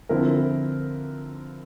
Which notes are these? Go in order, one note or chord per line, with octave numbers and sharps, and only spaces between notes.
D3 F3 C4 E4 A#4